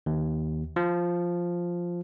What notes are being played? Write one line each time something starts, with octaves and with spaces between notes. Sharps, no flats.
D#2
F3